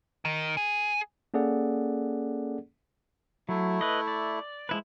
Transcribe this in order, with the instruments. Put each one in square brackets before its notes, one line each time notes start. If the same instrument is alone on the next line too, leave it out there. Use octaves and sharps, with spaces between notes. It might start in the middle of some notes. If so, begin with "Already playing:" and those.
[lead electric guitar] D#3
G#4
[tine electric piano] A#3 C#4 G#4 A4 D5 F#5
[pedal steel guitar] F#3 [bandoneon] A3 E4
[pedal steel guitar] B4 D#5
D5
[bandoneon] F3 [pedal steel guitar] G#3 E4 B4